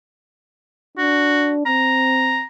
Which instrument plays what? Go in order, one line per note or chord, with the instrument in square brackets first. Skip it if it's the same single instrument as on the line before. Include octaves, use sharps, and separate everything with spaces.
[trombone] D4 [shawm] F#4
[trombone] C4 [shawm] A#5